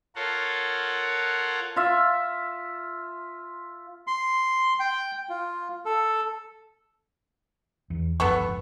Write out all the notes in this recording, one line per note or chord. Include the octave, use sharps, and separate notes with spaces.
F4 A4 A#4 C#5 F5 F#5
F4 E5
C6
G5
F4
A4
E2
D1 G1 F2 B3 A4 C#6